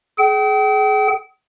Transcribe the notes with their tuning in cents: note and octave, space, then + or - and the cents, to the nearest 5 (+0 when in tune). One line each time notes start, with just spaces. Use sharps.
G#4 +30 G5 -35